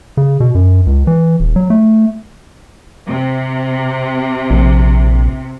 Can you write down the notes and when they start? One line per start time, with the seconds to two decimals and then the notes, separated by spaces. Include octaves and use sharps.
0.17 C#3
0.40 B2
0.55 F#2
0.86 C#2
1.07 E3
1.40 D#1
1.56 F#3
1.70 A3
3.07 C3
4.50 A#1